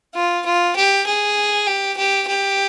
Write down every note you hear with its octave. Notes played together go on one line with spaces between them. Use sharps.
F4
F4
G4
G#4
G4
G4
G4